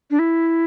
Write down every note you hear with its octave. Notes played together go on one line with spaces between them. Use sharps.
D4
E4